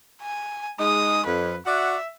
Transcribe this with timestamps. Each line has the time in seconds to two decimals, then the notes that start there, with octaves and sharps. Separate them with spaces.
0.22 G#5
0.80 G#3 D#4 D#6
1.26 F2 B4
1.66 F#4 D5 E5 F#5